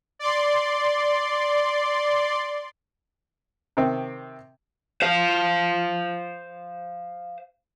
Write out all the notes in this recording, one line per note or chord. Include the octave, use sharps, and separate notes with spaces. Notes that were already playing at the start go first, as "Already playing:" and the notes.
D5 C6
C3 D#3 C4
C5 F5